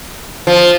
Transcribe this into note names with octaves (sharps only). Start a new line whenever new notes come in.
F3